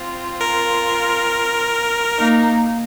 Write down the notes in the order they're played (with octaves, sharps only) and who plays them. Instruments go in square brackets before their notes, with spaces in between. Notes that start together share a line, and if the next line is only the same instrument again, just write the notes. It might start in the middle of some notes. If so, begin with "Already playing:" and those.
Already playing: [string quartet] C4 F4
[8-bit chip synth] A#4
[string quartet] A#3 D#4